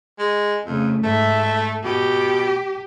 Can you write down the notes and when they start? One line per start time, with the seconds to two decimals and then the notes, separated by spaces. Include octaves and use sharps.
0.19 G#3
0.66 F2 C#3 A3
1.03 G#2 A3 E5
1.84 B2 G4